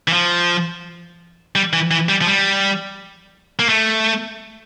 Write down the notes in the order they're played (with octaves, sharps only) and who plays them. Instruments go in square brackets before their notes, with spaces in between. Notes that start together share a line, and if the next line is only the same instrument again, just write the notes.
[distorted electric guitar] E3
F3
G3
E3
E3
G3
F3
G3
A#3
A3